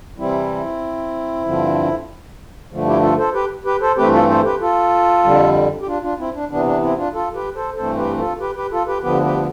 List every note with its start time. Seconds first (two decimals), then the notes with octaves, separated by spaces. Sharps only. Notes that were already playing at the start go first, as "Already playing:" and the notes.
0.18 C3 E3 G3 C4 E4
1.45 G2 D3 F3 C4
2.71 G2 D3 F3 A3
2.86 E4 G4
3.02 F4 A4
3.18 A4 C5
3.33 G4 B4
3.65 G4 B4
3.81 A4 C5
3.97 G2 E3 A3 C4 G4 B4
4.13 F4 A4
4.29 A4 C5
4.44 G4 B4
4.61 F4 A4
5.24 F2 D3 G3
5.82 G4
5.87 D4 F4
6.02 D4 F4
6.18 C4 E4
6.34 D4
6.50 C3 E3 B3 D4
6.66 D4
6.82 C4 E4
6.97 D4 F4
7.14 F4 A4
7.34 G4 B4
7.55 A4 C5
7.76 G2 E3 A3 C4 A4 C5
7.97 G4 B4
8.18 F4 A4
8.40 G4 B4
8.55 G4 B4
8.71 F4 A4
8.87 G4 B4
9.03 D2 D3 F3 B3 G4 B4
9.24 G4 B4